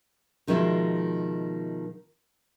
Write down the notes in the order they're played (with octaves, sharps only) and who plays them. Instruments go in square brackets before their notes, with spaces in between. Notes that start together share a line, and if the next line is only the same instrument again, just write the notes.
[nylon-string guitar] B2 D#3 F3 G#3 E4 A#4